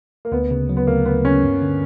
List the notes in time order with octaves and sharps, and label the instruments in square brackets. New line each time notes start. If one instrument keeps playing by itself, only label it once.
[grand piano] A#3
[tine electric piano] D2 [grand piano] B3
[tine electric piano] C#3
F#3
[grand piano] B3
[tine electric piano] D2 [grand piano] A#3
[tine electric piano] D2 [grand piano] B3
[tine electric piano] C#3 [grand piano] C#4
[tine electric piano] G2
D3